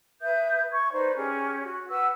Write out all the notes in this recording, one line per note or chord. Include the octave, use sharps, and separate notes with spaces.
B4 E5 D#6 G6
C#6 G#6
D#4 B4 C5 D5
C#4 G4 G#4
F#4
B4 F#5 E6